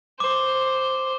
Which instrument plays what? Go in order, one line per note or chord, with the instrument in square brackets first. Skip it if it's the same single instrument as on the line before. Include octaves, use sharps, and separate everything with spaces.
[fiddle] C5 [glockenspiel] D6